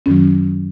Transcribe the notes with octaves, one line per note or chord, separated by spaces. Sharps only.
F#2 D#3 F#3 C#4